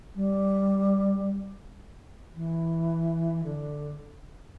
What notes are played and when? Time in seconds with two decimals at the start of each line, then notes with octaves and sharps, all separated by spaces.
0.15 G3
2.35 E3
3.44 D3